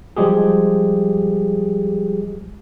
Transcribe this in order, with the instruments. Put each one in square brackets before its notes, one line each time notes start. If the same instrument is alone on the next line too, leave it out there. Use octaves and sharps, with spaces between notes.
[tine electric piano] F3 G3 G#3 G4 G#4